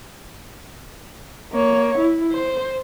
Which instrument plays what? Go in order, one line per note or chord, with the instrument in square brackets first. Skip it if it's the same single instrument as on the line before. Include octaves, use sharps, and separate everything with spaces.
[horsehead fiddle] A#3 C#5
E4
C5